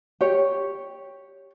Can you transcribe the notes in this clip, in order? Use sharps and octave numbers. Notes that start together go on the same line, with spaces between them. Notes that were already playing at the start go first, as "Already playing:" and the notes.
G4 C#5